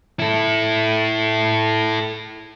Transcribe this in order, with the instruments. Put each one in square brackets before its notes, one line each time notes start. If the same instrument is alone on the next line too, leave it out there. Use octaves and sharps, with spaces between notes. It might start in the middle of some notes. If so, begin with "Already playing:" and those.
[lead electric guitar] E4 A4